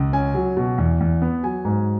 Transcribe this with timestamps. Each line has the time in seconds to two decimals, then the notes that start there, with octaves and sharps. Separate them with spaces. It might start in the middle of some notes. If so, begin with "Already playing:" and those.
Already playing: C#2
0.13 C#4 G#5
0.35 F#3
0.57 B2
0.78 E2
1.00 E2
1.22 B3
1.43 F#3 G#5
1.65 G#2